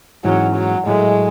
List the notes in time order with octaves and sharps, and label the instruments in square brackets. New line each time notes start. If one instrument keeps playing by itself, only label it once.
[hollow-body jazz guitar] G#2 E3 G#3 C#4 [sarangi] F#3
[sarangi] F#3
[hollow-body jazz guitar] A2 F#3 A3 [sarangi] G#3